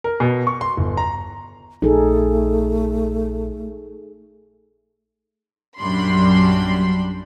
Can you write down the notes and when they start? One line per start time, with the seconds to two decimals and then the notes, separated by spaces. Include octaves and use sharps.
0.04 A#4
0.20 B2
0.47 C#6
0.61 C6
0.77 G1
0.97 A#5
1.82 A#1 A3 D#4 G#4 A4
5.80 A#1 F#2 G3 D4 B5 C6